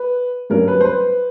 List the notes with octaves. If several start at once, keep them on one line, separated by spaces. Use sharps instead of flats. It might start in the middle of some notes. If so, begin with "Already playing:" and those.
Already playing: B4
G2 D3 F#3 A#3 C#4 A#4
B4
C5
B4